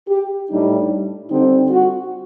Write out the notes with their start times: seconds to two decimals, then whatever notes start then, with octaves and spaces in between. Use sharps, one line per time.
0.09 G4
0.49 A2 G3 D4 D#4
1.30 D3 G3 C4 D#4
1.71 F#4